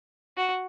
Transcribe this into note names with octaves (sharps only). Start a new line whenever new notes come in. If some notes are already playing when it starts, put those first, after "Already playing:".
F#4